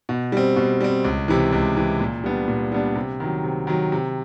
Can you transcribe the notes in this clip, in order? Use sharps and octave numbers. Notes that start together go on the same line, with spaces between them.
B2
G3 C4
B2
G3 C4
C#2
C3 E3
C#2
C3 E3
A#2
G3 B3 D4
A#2
G3 B3 D4
C3
D#3 F#3
C3
D#3 F#3
C3